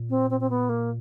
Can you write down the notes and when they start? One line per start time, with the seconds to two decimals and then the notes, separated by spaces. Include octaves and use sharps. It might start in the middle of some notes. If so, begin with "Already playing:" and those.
Already playing: A#2
0.09 C4
0.30 C4
0.40 C4
0.50 B3
0.69 A#3